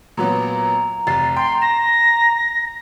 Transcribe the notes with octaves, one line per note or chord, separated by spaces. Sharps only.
A#2 F#3 B3 A#5
F1 A6 C7
G5 C6
A#6 E7